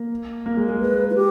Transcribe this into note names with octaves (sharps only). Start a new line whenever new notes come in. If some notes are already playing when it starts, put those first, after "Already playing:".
Already playing: A#3
A#3
G#3
G#3
B4
E4
G4